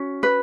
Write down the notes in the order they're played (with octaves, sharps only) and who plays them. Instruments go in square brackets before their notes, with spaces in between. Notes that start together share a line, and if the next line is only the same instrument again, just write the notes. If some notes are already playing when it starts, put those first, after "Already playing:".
Already playing: [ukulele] C#4 [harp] F#4
[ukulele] B4